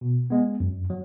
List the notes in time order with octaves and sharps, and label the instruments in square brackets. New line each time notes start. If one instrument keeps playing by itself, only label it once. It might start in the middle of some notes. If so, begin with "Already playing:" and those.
[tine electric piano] B2
G#3 B3
F#2
F#3